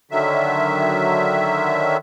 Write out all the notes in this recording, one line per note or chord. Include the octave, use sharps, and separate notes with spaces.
D3 D#3 F#3 E5